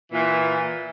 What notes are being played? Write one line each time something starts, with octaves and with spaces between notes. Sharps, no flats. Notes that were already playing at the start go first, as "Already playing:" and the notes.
A#2 E3